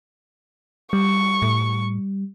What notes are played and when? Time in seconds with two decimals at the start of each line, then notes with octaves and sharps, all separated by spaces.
0.93 G3 C#6
1.42 A2